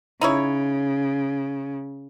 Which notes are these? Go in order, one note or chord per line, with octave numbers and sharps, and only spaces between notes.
C#3 D#4 E4 C#5